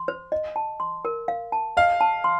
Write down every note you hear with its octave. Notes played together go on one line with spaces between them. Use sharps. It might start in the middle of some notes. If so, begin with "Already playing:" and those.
Already playing: C6
C5
D#5
A5
C6
A#4
F5
A5
D#5 F5
A5
C6